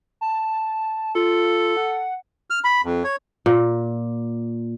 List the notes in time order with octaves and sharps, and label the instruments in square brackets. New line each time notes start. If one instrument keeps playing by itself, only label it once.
[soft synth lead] A5
[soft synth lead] F4 [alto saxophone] A4
[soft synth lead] F#5
[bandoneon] F6
B5
F2
C#5
[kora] A#2